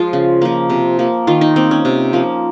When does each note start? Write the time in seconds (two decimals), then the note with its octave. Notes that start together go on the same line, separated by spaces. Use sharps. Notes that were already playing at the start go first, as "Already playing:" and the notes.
Already playing: F3 G#3 F4
0.13 C#3
0.42 F3 A#3
0.70 C3
0.99 F3 A#3
1.27 D#3 F4
1.41 D#4
1.56 A#3 C4
1.71 C#4
1.85 C3
2.13 F3 A#3